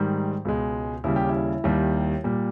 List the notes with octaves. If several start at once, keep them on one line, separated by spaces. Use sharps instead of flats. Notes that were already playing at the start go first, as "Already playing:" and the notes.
Already playing: G#2 D#3 G3
C#2 B2 G#3
D#2 C#3 G3 E4
G4
E4
D#2 D#3 G3
A#2 G3